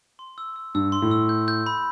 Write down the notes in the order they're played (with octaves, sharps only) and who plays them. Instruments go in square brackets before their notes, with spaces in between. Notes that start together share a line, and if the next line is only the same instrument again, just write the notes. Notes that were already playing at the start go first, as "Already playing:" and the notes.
[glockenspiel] C6
E6
E6
[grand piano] G2 [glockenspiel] E6
[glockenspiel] C6
[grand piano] A2
[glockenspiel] E6
G6
G6
B5